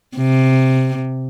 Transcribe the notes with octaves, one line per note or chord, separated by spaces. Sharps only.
C3